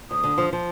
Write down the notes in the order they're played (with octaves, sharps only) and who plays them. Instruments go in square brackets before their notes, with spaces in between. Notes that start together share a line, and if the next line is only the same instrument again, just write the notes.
[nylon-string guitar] D2 [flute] D#6
[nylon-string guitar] D3
F3
F3